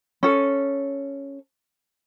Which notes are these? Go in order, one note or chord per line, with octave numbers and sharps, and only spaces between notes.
C#4 A4